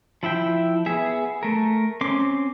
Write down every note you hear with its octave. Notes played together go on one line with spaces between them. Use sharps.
F3 E4 E5 G5
B3 G#4 E5
A3 A#4
C4 C#4 C6 D6